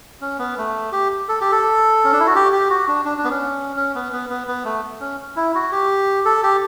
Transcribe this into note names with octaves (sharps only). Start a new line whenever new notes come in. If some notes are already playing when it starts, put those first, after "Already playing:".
C#4
B3
A3
G4
A4
G4
A4
C#4
D4
E4
F#4
G4
G4
F#4
D4
D4
D4
B3
C#4
C#4
B3
B3
B3
B3
A3
C#4
E4
F#4
G4
A4
G4